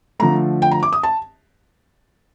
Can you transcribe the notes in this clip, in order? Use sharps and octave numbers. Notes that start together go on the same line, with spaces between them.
D3 F3 A3 A#5
G5
A#5
D6
D#6
A5